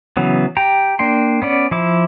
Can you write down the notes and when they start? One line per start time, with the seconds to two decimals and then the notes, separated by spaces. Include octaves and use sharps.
0.17 C#3 E3 F#3 B3
0.57 G4 G5 A#5
0.99 A#3 D4 G5 C6
1.42 B3 C#4 D5
1.71 F3 E4 D6